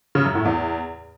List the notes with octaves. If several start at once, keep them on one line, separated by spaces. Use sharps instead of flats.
C#3
F#2
A2
E2